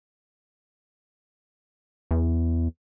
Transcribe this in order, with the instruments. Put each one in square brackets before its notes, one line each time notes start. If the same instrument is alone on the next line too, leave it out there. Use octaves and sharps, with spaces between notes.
[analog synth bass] E2